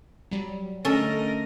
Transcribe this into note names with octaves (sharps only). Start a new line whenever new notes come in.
F#3 G3
D3 A3 C#4 A4 A#4 D#5